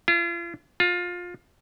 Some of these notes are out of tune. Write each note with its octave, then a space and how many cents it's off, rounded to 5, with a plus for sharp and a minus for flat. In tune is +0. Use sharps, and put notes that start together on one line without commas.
F4 -40
F4 +20